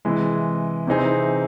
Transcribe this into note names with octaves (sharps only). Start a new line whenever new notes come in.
C3 E3 G#3
C3 E3 C4 D#4 G#4